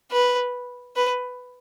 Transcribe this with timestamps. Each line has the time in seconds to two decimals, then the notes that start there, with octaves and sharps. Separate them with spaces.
0.12 B4
0.96 B4